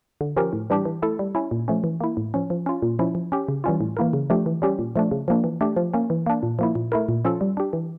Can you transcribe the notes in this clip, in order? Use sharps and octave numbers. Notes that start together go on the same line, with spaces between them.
D3
F3 C#4 G4 A#4
A2
E3 G3 D4 G4
E3
A3 E4 A4
G3
C#4 E4
A#2
F3 A3 C#4
E3
A#3 E4
A2
F3 C#4
F3
C#4 F4
A#2
F3 C#4 E4
F3
C#4 G4
C#3
E3 G3 C#4 F4
A2
E3 A#3 E4 A#4
C#3
F3 A3 D4 G4
E3
G3 C#4 G4
A#2
F3 A3 D4
C#3
F3 A#3 D4
E3
A3 D4 G4
F3
A#3 C#4
E3
A#3 D4
A#2
F3 A#3 E4
A#2
A3 E4 A#4
A#2
F3 C#4 F4 A4
G3
D4 G4
E3